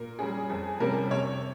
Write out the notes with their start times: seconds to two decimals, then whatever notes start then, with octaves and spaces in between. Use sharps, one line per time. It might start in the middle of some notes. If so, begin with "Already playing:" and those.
Already playing: A#2 A#4
0.19 G3 C#4 G#4
0.50 F2 G#4
0.80 C3 G3 C#4 A#4
1.11 C3 C#5